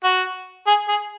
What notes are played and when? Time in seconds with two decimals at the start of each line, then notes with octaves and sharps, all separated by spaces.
0.04 F#4
0.67 G#4
0.88 G#4